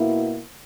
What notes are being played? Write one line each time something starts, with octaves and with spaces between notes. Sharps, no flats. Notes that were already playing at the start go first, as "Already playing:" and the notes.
Already playing: B2 A#3 E4